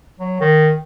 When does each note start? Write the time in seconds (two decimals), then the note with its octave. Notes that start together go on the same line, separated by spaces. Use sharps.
0.20 F#3
0.41 D#3